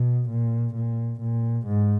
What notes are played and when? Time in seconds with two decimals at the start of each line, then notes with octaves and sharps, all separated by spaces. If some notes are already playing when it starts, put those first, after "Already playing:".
Already playing: B2
0.30 A#2
0.74 A#2
1.21 A#2
1.67 G#2